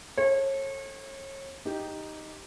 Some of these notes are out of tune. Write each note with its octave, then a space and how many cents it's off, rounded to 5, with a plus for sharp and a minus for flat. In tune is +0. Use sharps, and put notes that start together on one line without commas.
A4 +0 C#5 -35
D#4 +0 G4 +0